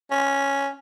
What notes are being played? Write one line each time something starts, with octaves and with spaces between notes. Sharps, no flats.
C#4